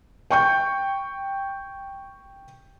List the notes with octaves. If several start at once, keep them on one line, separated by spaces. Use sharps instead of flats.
G5 C#6 G6